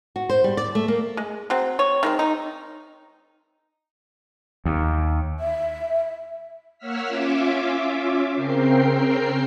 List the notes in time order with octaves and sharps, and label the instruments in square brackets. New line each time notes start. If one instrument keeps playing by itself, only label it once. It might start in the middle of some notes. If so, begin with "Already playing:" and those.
[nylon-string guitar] F#4
C5
G3
D5
A3
A#3
[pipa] G#3
F#3 C4
C#5
D#3 G#3 C4
D#4
[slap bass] D#2
[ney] E5
[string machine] A#3 C#5 F#5 E6 F6 B6
C#4 F4 E5 D6
C#3 C4 A#4 G5 C7